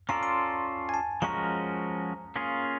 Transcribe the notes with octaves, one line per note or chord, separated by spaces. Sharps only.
C#4 F4 A4 D5 A#5
C6
G#5
A5
F3 G#3 C#4 F#4 A#4 A#5
A#3 C#4 F4 G#4